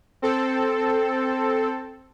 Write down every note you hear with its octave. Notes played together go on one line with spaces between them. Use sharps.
C4 A4